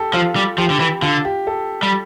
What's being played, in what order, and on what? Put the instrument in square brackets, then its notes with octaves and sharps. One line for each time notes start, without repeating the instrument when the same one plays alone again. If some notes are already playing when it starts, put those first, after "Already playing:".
Already playing: [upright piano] G4 A4
[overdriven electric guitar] F3 [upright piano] F4
[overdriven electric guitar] G3
[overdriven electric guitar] F3 [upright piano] G4
[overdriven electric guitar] D3
E3
[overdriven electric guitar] D3 [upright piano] F4
[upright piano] G4
A4
[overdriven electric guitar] G3